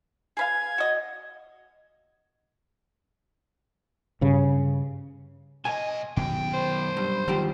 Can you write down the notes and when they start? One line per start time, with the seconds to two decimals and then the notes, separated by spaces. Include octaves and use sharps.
0.37 G#4 B4 F5 G#6
0.78 F#4 D#5
4.21 G2 C#3
5.65 B1 D#5 G#5
6.17 F#2 B2 D#3 F#3 G5
6.54 C5
6.97 G2
7.28 E2 D#3 F3 G3 G4